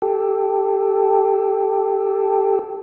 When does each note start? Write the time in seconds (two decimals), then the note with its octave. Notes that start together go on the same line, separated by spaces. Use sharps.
0.02 G4 A4